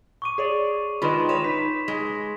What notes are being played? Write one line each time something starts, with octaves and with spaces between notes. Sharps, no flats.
C#6 D6 D#7
G#4 C#5 D5
D#3 G#3 F4 B4 B5 C6 E7
B4 C#5 E7 F7
D#4 B6
G#3